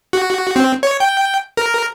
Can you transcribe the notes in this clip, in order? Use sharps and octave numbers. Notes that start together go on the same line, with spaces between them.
F#4
C4
C#5
G5
A#4